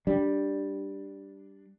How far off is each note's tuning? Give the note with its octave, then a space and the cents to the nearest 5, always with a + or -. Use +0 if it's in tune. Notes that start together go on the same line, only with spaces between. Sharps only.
G3 +0 D4 +0